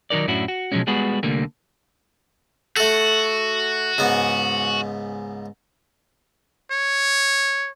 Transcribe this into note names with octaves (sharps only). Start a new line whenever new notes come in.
D#3 F#3 D#4 A#4 D5
F#2 A2 C#4 D4 E4 F#4
F#4
B2 F3 F#3 G#3 C#4
G3 G#3 B3 F#4 G#4 B4
C2 D3 G3 A3 A#3
A3 F#4 A4
C#2 G#2 B3
C#5